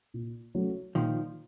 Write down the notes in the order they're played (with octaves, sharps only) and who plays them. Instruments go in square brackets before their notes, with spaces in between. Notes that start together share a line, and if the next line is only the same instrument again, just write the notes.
[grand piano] A#2
F#3 A3 C#4
[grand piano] A#2 [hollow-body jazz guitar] D#3 F3